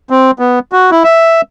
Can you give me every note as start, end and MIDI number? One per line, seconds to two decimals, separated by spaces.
0.10 0.31 60
0.39 0.59 59
0.72 0.90 66
0.91 1.03 64
1.04 1.41 76